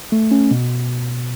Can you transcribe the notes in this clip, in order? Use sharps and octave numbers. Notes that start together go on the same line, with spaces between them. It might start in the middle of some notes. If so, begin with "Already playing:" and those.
A3
C#4
B2